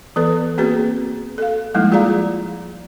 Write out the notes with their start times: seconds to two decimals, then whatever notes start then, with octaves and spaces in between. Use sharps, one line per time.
0.16 E3 B3 A4 B4
0.58 A#3 C4 F#4 G#4 B4
1.38 A4 F5
1.74 F3 G3 G#3 A#3 D#4 E4
1.92 F4 G#4 D5 F5 A#5